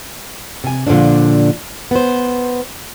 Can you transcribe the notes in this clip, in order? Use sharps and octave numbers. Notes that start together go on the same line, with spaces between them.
C3 G#5
A#2 D3 E3 F3 A3 D4
B3 C5